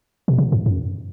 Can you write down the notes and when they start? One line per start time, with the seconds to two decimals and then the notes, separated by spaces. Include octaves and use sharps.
0.28 B2
0.38 C3
0.52 G2
0.66 F#2